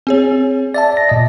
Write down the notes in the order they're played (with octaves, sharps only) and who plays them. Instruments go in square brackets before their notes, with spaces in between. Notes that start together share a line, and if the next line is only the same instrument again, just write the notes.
[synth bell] C4 G#4 C#5
[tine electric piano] D5 E5 A5 [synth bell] A6
[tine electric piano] A#6
A#2 D#5